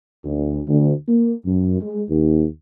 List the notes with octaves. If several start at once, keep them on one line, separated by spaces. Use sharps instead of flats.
D2
D2
A#3
F#2
G#3
D#2